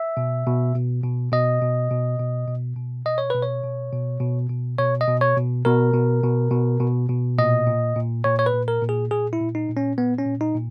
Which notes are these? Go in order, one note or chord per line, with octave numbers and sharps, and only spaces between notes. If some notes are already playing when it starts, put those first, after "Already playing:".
Already playing: E5
B2
B2
B2
B2
B2 D#5
B2
B2
B2
B2
B2
B2 D#5
C#5
B2 B4
C#5
B2
B2
B2
B2
B2 C#5
D#5
B2
C#5
B2
B2 A#4
B2
B2
B2
B2
B2
A#2 D#5
A#2
A#2
A#2 C#5
C#5
B4
A#2
A#4
A#2
G#4
A#2 G#4
E4
A#2
D#4
A#2
C#4
A#2 B3
C#4
A#2
D#4
A#2